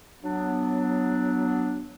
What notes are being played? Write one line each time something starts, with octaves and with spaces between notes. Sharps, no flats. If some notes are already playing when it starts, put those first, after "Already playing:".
F#3 B3 D4